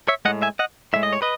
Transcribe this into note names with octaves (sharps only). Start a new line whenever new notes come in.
C#5 E5
A2 G#3 D#5 F#5
E5 G#5
D#5 F#5
A2 G#3 E5
D#5
C#5
B4 D#5